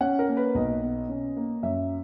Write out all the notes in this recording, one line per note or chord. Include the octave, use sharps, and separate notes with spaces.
C#4 F#5
A#4
A#3
B4
B1 D#5
B2
C#4
A#3
F#2 E5